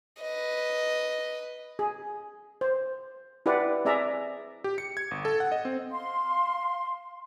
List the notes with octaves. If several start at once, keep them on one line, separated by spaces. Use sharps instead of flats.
B4 D#5
G#4
C5
E4 G4 B4 D5 F#5
C4 G#4 D5 E5 A#5
G4
C#7
G#6
G1
A4
F#5
D#5
C4
F5 C6